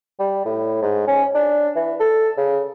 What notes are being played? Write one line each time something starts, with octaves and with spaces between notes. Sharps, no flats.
G3
A2
G#2
C#4
D4
E3
A4
C#3